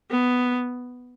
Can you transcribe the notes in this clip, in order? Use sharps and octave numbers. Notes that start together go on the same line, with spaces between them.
B3